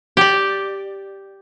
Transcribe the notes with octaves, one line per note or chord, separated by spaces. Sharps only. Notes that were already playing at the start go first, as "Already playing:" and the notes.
G4 D5